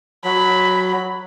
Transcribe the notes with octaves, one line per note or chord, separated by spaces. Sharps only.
F#3 B5